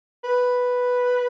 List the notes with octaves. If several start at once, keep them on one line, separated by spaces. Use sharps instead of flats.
B4